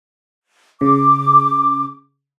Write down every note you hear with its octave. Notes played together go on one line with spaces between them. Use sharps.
C#3 D6